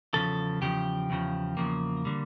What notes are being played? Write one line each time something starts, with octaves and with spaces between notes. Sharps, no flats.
E2 C#3 F3 A4
E2 C#3 F3 G4
E2 C#3 F3
E2 C#3 F3 A#3
D3 G3